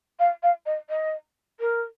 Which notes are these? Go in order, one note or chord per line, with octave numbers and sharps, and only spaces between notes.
F5
F5
D#5
D#5
A#4